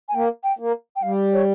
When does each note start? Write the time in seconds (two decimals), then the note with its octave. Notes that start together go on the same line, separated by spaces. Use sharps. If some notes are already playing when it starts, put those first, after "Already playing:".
0.09 G#5
0.15 A#3 G5
0.44 G5
0.59 A#3
0.96 G5
1.03 G3 F5
1.34 C#5